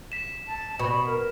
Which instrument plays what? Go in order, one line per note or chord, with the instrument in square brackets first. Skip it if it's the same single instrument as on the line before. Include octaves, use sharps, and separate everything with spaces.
[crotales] B6 E7
[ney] A5
[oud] B2 [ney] B5
[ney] A#4